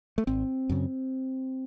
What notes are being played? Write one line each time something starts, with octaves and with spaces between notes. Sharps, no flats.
A3
G#1 C4
F#2 C#3